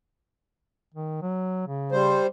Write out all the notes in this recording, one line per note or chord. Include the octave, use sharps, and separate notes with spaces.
D#3
F#3
C#3
G3 C5